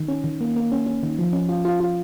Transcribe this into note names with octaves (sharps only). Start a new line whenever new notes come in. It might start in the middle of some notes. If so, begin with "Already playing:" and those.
Already playing: D#3
C#4
D#3
A#3
A#3
C#4
C#4
D#3
F3
C#4
F4
F4
F4